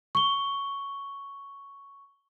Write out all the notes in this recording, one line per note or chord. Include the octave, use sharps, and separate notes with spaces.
C#6 G7